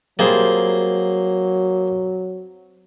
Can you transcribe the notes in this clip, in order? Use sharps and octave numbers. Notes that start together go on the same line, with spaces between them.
F#3 G3 A#3 C4 F4 G#4 C5